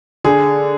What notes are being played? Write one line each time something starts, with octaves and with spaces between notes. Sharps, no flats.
D3 G#4